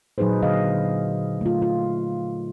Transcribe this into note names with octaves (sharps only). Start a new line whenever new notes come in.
A#2 F#3 D#4 G#4 B4 C5
D3 G#4 D#5 F5
A3 F4
F4